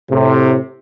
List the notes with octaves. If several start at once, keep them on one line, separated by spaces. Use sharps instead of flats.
A2 C3